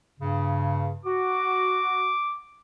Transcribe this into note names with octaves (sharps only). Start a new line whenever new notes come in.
G2 C#3
F#4 D6